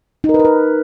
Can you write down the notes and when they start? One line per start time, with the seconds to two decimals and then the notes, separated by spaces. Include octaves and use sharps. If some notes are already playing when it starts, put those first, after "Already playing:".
0.24 D#4
0.29 A#4
0.34 B4
0.39 A#4
0.45 B4